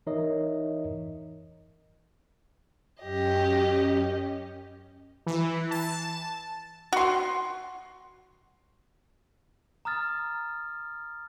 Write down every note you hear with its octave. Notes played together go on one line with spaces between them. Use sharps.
E3 D#4 A#4 C#5 D#5 E5
F#2 C#4 G4 D#5
E3
A5
F#4 C6
A#5 D#6 F6 A6